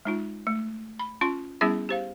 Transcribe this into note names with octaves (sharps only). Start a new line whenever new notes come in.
G#3 D#4 F4
A3
B5
C#4 F4 C6
G3 B3 C#4 E4 G#4 E5
G4 C5 F5